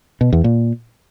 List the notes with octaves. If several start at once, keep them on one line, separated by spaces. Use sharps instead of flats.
B2
E2
A#2